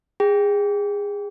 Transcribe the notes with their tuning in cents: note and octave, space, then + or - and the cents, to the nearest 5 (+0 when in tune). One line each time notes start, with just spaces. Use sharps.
G#4 -25 G5 +0